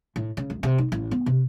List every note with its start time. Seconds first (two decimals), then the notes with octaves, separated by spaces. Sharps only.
0.16 A2
0.37 C#3
0.50 D2
0.63 C3
0.78 D#4
0.92 A1
1.11 B3
1.26 C3